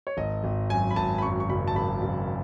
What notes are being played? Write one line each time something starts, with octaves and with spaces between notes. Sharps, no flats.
C#5
G#1 D#5
G#1
F#2 G#5
B5
G#1 A5
B5
F#2 C#6
C#6
F#1 B5
A5
F#1 B5
F#1